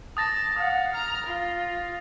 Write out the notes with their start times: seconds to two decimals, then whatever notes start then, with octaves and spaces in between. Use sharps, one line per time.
0.17 A5 D#6 A6 A#6
0.56 F5 F#5 D#6
0.92 A#5 F6
1.26 F4